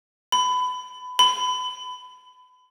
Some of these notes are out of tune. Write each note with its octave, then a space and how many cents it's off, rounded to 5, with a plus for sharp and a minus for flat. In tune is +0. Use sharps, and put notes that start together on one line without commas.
B5 +25
B5 +30